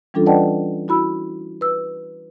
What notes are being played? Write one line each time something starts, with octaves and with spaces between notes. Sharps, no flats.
E3 G3 C#4 D4 F4 A4
B4 D5 D#5 F#5 G5 A5
E4 F#4 B5 E6
B4 E6